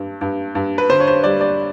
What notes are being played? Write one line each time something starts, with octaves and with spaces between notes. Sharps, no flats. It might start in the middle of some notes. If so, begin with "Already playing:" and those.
Already playing: G2
G2
G2
B4
D3 C5
C#5
C5
G3 D5
D5